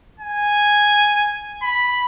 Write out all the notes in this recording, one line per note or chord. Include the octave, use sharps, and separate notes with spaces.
G#5
B5